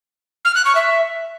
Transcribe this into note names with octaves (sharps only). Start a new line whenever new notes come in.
F6
F#6
C#6
E5